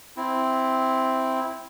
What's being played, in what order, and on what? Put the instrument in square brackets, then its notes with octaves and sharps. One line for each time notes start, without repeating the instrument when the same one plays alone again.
[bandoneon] C4 E4